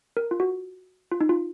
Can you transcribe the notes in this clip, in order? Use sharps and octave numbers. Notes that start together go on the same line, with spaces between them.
A#4
F4
F#4
F4
D#4
F4